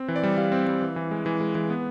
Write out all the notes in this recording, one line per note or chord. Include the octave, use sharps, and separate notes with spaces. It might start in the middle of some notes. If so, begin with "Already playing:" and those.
Already playing: C4
E3
D5
G3
G3 F5
C4
G3
E3
E3
G#3
E3
G#3
E3
B3